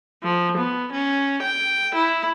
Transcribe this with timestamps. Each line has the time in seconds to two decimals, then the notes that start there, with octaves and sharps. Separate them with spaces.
0.23 F3
0.57 B3
0.92 C#4
1.42 G5
1.95 E4